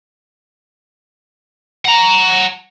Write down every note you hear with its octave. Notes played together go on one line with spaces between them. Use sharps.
F#5 A#5